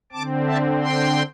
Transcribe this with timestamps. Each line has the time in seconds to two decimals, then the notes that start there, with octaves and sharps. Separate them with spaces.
0.12 D3 C4 A5 D6
0.47 E5 A5
0.81 G5 C6